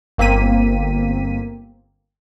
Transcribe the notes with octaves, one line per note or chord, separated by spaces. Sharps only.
G1 A#3 C4 B6 D#7